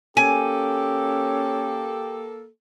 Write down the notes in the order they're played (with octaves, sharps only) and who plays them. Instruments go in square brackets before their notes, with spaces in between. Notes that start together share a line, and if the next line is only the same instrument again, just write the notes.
[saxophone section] A#3 A4 [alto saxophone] C#4 [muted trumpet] G4 [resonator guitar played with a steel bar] G#5